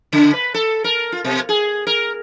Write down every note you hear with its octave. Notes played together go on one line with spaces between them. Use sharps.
C#3
B4
A4
A#4
F4
B2
G#4
A#4